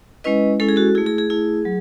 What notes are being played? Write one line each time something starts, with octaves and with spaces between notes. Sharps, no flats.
G#3 C#4 E4 B4 D#5
G#3 C#4 E4 A4
G#4
F#4 A4
A3 E4 G#4
G#4
G#4
A3 E4 G#4
F#3